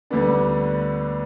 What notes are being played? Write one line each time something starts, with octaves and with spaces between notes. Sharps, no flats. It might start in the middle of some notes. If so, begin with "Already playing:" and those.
D2 D3 G3 B3 D4